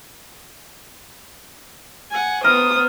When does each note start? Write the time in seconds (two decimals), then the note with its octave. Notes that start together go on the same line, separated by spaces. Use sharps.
2.11 F#5 G#5
2.44 B3 A#4 C5 D#6